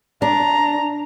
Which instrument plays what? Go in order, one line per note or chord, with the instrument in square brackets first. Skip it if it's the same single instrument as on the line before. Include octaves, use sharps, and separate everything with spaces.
[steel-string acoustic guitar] D4 [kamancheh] A#5